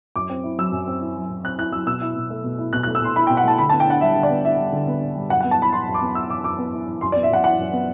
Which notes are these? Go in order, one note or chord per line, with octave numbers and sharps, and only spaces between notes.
F#2 D6
C4
E4
F#3 E6
F#2
C4
E4
F#3
F#2
C4 F#6
E4 F#6
F#3 E6
B2 E6
E4
B2
A3
B2
E4
B2 F#6
F#6
A3
E6
B2 C6
E4 B5
G5
B2
F#5
A3 A5
D3 B5
A5
B3
G5
D4 F#5
G3 E5
D3
D5
B3
D4 E5
G3
D3
B3
D4
G3
F#2 F#5
F#5
B3
A5
E4 B5
E3 C6
F#2
D6
B3
E4 E6
E3 D6
F#2 D6
B3
E4
E3
F#2 C6
D5
B3
E5
F#2 F#5
E3 F#5
F#2
B3